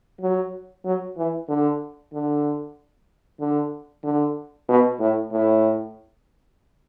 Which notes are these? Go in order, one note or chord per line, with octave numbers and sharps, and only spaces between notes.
F#3
F#3
E3
D3
D3
D3
D3
B2
A2
A2